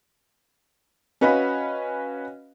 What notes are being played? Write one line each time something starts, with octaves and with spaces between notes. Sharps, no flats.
C#4 F#4 B4 D#5 F5 B5